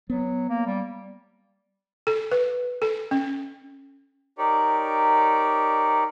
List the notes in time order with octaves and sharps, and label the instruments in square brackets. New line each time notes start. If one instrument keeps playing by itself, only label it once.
[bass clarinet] F#3 [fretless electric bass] B3
[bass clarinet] A#3
G3
[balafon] A4
B4
A4
C#4
[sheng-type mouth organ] D#4 G4 A#4 C#5 D5